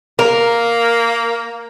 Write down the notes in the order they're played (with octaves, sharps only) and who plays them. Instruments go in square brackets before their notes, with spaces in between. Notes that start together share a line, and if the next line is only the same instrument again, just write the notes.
[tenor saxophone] A#3 [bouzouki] A#4